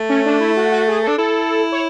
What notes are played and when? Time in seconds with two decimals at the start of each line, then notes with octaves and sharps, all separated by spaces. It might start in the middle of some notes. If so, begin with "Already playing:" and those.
Already playing: A3
0.09 C#4
0.26 D4
0.40 E4
0.56 F#4
0.72 F#4
0.88 G#4
1.03 D4 A4
1.18 E4 A4
1.72 C#5